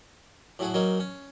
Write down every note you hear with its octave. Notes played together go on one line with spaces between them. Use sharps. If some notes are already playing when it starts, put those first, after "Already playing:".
A2 F#3 F#4 G#4
F#3 A#3 C#4 D#4
C#4